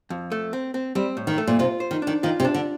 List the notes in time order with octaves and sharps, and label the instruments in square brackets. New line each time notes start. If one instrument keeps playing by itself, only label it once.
[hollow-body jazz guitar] F2
A3
C4
C4
[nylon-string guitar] G3 [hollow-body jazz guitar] C4
[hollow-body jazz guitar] A2
[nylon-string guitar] D#3
[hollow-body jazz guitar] A3
[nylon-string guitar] A#2
[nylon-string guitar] C3 [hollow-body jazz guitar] F4
[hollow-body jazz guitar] C5
[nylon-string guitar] D#3
[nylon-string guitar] D#3 [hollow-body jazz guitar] D4
[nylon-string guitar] D#3 [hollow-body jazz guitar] F4
[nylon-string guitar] C3
[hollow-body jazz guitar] D4
[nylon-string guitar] D3